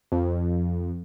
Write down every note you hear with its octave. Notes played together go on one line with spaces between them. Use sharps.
F2